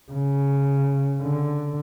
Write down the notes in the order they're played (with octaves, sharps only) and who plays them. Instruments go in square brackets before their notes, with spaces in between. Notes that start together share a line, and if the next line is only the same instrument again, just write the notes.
[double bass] C#3
D3